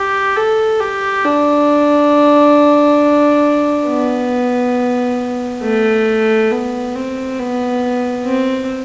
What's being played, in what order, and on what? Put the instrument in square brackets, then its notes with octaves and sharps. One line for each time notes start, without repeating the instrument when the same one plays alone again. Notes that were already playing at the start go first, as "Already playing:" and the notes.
Already playing: [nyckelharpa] G4
A4
G4
D4
B3
A3
B3
C4
B3
C4